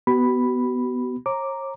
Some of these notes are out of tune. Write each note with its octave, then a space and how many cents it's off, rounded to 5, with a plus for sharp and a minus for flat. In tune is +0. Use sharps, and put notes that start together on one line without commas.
B3 +5 F#4 +40 B5 +0
C#5 -40 A#5 +0 D6 +0